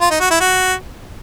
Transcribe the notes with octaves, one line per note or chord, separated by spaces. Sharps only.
F4
D#4
F#4
E4
F#4